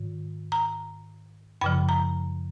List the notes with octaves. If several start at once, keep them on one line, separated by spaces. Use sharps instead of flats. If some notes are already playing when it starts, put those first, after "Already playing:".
Already playing: G#2 D#3
A#5
F#2 C#3 F3 B5
A#5